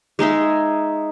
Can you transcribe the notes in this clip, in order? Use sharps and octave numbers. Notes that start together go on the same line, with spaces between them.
G#3 D#4 G#4 E5